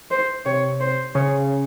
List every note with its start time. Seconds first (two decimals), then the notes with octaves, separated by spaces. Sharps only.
0.11 C5
0.46 C3 C#5
0.80 C5
1.15 C#3 C#5